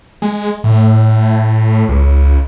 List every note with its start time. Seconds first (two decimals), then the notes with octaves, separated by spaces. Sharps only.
0.22 G#3
0.64 A2
1.89 C#2